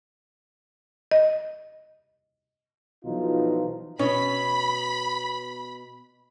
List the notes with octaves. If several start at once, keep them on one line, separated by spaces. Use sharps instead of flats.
D#5
B1 B2 E3 F3 D#4 F4
B2 C#4 B5